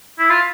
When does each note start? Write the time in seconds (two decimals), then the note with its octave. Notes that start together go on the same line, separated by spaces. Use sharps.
0.19 E4
0.30 F4